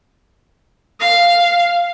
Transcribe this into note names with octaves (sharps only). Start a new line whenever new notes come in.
F5